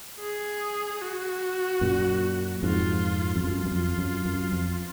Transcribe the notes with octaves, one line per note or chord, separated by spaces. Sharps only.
G#4
F#4
F#2 A#2
F2 G#2 F4
F2
F#2 F4
F#2
F2
F#2
F#2
F2